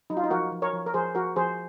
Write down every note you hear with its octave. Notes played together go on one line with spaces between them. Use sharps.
F#3 D#4
F4
D#4
F3 F#4 A#4
F3
A#4 C#5
F3
A#4
F3 G#4 C5
F3 F#4 A#4
F3 G#4 C5